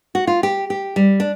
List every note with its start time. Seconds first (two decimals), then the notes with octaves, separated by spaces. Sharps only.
0.15 F#4
0.27 F4
0.43 G4
0.70 G4
0.96 G3
1.20 D4